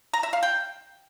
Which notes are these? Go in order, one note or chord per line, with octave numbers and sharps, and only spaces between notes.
A#5
E5
F5
G5